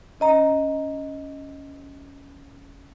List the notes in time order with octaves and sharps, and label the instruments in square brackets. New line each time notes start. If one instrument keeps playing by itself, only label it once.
[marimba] C#4 D#5 A#5